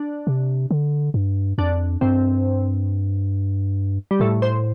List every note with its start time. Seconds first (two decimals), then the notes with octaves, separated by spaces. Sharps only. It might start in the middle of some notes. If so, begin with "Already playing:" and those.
Already playing: D4
0.27 C3
0.71 D3
1.14 G2
1.58 F2 D4
2.01 G2 C4
4.11 G3
4.20 A2 A3
4.42 C5